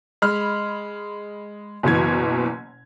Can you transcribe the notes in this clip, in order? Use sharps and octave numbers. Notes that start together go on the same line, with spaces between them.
G#3 B5 F6
F#1 B2 E3 G#6